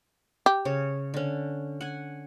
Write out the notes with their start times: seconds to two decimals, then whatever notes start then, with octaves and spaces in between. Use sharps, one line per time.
0.46 G4
0.65 C#3 C#5
1.14 D3 C#4
1.81 F#5 G#5